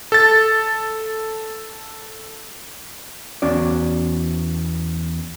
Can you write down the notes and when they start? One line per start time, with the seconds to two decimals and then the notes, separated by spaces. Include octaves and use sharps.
0.12 A4 A6
3.42 E2 C#4 F#4 D5